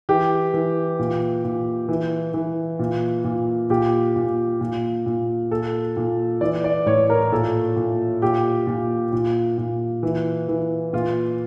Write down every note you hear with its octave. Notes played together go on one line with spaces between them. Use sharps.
E3 G4
E3
A#2
A#2
E3
E3
A#2
A#2
A#2 G4
A#2
A#2
A#2
A#2 A4
A#2
E3 D5
D5
A2 C#5
A#4
A#2 A4
A#2
A#2 G4
A#2
A#2
A#2
E3
E3
A#2 F4